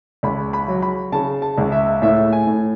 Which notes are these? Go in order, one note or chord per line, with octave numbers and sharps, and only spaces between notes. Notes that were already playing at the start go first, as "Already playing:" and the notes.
C#2 B5
B5
F#3
B5
C#3 A5
A5
C#2
E5
A2 E5
G#5
A2